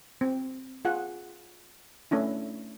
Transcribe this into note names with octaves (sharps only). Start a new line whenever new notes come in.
C4
F4 G#4 F#5
A3 C#4 D4 E4